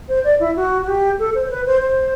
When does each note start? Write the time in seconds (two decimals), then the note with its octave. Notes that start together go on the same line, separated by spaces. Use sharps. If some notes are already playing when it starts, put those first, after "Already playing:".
0.09 C5
0.24 D5
0.40 E4
0.56 F#4
0.82 F#4
0.88 G4
1.19 A4
1.35 C5
1.46 C5
1.51 B4
1.66 C5
1.82 C5